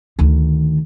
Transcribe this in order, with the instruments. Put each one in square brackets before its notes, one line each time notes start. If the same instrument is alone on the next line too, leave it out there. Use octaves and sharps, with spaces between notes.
[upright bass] D2 D#3